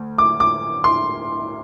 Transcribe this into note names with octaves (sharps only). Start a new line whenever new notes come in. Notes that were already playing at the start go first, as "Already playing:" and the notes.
Already playing: D2
D6
D6
C6